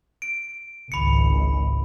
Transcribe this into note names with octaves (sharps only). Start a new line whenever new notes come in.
D7
G#1 C#2 B5 C#7